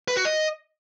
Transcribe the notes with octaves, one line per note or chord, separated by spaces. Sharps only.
B4
F#4
D#5